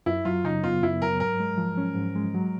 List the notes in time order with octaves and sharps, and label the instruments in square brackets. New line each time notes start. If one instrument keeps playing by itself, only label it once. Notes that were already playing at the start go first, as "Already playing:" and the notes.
[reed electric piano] F#2 [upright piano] E4
[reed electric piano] F#3 [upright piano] F4
[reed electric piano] C#3 [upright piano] D#4
[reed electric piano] B3 [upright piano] F4
[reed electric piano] F#2 [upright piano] E4
[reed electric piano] F#3 [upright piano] A#4
[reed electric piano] G#2 [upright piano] A#4
[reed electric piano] G#3
F3
C#4
G#2
G#3
F#3